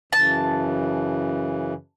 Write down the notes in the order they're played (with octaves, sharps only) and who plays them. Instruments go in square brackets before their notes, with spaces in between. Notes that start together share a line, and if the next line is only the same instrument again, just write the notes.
[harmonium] F#2 C#3 E3 [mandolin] A5